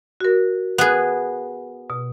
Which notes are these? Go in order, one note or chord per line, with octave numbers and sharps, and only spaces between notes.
F#4 A#4
B3 G#4 F#6
B2